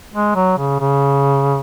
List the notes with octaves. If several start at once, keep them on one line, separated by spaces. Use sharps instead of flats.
G#3
F#3
C#3
C#3